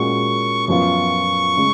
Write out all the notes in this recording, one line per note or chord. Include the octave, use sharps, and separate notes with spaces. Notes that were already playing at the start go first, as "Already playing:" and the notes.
Already playing: A#2 G#3 C#4 F#4 C#6
F#2 F3 B3 F4 C#6
C#3 G#3